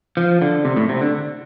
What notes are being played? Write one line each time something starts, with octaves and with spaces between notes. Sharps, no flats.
F3
D3
C3
A2
C3
D3